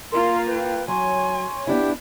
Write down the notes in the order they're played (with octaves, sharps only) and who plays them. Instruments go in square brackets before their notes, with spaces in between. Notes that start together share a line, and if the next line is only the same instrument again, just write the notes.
[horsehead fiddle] A#3 F4 [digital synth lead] A#4 [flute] C6
[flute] B4 [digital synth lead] G5
[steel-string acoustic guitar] F#3 [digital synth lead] C#5 [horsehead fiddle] G#5 [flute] C6
[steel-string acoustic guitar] B3 D4 E4 [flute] G4